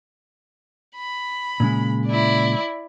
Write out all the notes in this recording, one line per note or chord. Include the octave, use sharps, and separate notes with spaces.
B5
A#2 C#3 G#3
E4 D5